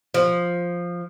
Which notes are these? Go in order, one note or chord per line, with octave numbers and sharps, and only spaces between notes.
F3